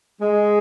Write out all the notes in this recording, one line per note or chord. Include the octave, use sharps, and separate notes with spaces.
G#3